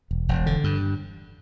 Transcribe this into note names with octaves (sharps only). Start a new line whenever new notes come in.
E1
E1
D3
G2